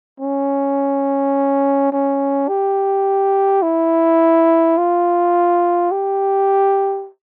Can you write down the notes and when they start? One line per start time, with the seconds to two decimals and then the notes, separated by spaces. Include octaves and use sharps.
0.20 C#4
1.92 C#4
2.49 G4
3.63 E4
4.78 F4
5.91 G4